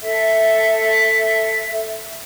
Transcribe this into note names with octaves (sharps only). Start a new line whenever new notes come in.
A4 E5